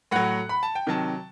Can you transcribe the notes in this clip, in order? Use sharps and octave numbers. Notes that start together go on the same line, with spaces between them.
A2 F#3 F#5
B5
A5
G5
C3 D#3 F#3 A5